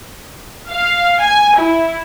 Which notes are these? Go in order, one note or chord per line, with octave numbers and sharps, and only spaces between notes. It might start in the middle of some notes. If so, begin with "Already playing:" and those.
F5
G#5
E4